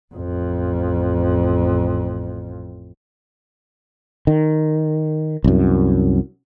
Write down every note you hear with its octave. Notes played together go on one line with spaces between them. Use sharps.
A1 F2
D#3
C2 F#2